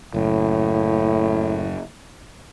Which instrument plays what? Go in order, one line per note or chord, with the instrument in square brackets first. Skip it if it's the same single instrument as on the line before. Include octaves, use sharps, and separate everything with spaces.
[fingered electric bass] F#1 [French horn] A2